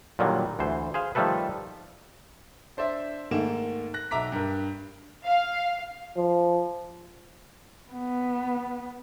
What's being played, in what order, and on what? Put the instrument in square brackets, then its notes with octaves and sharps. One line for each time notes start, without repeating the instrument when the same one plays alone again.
[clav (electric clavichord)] A#2 D3 D#3 F#3 G3
D2 E3 C5
G#4 C5 F5
D#3 F3 G3 A3 A4 B4
[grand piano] D4 C5 D5 E5
G#2 D#3 A3 A#3 E7
F#6 A#6
B1 E5 A#5 D6 B6
G2 A#4
[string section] F5
[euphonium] F3
[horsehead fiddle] B3